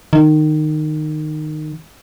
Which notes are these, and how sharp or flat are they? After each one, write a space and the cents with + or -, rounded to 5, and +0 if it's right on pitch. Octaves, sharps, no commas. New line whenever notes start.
D#3 -20